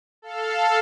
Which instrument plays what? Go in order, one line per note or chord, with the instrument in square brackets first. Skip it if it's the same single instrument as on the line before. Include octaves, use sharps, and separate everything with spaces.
[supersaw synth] A4 F5